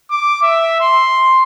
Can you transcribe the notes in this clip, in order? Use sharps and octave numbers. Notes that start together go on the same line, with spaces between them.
D6
E5
C6